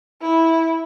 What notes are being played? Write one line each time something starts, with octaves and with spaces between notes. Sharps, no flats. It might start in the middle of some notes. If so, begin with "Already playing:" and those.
E4